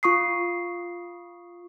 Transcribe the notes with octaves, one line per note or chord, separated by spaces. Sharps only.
F4 C#6 D#6 C7